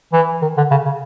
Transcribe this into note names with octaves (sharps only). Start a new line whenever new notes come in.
E3
D#3
D3
C#3
C#3